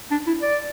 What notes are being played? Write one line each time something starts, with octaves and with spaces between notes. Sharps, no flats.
D4
E4
D5